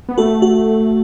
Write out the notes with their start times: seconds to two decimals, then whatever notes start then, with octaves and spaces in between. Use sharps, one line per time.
0.09 B3
0.18 A3 F#4 A4
0.42 F#4